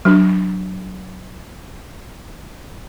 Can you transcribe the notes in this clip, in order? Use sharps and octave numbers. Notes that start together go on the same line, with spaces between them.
F#3 D4